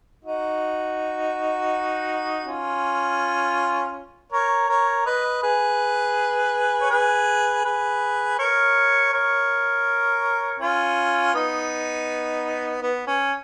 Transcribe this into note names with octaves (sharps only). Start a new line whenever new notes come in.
D#4 F#4
C#4 F4
A#4 C#5
A#4 C#5
B4 D#5
G#4 B4
C#5
G#4 B4
G#4 B4
A#4 C#5
A#4 C#5
C#4 F4
B3 D#4
B3
C#4